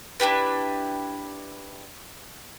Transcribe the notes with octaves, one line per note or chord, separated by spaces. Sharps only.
D4 E4 G4 B4